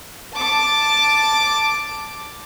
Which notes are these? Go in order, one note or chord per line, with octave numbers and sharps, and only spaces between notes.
A5 D6